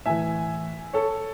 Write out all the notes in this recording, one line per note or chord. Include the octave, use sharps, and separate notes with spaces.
A2 E3 E5 G#5
A4 C#5